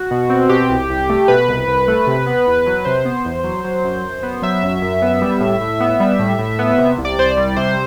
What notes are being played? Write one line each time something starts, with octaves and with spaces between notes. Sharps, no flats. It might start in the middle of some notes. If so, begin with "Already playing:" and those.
Already playing: F#4
B2
C4
B2 G4
C2
C2
A3
B2 B4
C2
C2
A3
C3
B3
E2
F#3
C3 C5
B3
E2
F#3
F#3
F#2
F#2
B3
F#3 E5
F#2
F#2
B3
G3
A2
A2
B3
G3
A2
A2
B3
C3
C2
D5
C2 C5
D5
G3
C3 C5